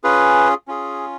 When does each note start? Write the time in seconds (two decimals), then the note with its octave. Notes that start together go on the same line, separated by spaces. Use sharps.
0.04 C#4 F4 G#4 B4
0.68 C#4 F4 G#4